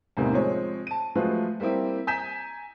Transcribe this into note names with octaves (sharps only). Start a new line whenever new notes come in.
E2 A2 C3 D#3 G3 A#3
F3 G#3 C4 C#5
A5 D#7
F3 F#3 G#3 A3 F4 B4
G3 A#3 C4 E4 G4
G#5 A#5 G6 B6 E7